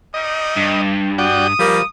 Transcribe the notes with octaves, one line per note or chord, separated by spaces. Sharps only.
G3 D#4 D#5
G2
F#4 D5 G5 D#6
F3 G3 A#3